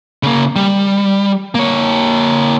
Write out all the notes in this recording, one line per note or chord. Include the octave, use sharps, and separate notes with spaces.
C#3 A#3
G3
A#3 C#5